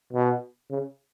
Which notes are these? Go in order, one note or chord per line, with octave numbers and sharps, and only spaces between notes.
B2
C#3